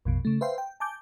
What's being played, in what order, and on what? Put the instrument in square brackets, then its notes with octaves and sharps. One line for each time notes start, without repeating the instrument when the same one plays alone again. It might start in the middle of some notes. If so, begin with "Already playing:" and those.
[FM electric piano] A#1 F2 B2
C#3 A3
B4 C5 E5 F5 G5 C6
G5
G#5 A5 D6 G6